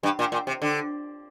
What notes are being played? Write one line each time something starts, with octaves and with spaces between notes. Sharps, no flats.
G2
A#2
A#2
C3
D3